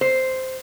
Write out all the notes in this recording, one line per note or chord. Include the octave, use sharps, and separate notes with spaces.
C5